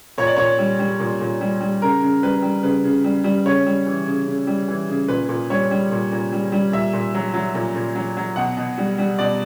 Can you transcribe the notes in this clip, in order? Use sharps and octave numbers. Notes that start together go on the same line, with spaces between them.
A#2 C#5
D5
A#2 C#5
G3
G3
A#2
A#2
G3
G3
C#3 A#4
C#3
G3 B4
G3
C#3 B4
C#3
G3
G3
C#3 C#5
G3
E3
C#3
C#3
G3
E3
C#3
A#2 B4
A#2
G3 C#5
G3
A#2
A#2
G3
G3
A#2 E5
A#2
F#3
F#3
A#2
A#2
F#3
F#3
B2 F#5
B2
G3
G3
B2 D5